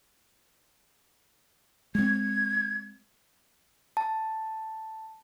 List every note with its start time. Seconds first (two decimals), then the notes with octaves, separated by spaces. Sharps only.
1.95 G#3 C4 G#6
3.97 A5